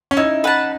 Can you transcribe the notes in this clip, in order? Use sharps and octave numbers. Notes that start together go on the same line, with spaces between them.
C#4
D#4 E4
B4 F#5 A5